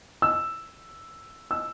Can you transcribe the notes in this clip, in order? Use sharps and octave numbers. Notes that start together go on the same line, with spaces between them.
E6
E6